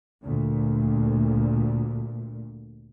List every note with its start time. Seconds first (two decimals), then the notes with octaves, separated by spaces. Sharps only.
0.23 D2 A#2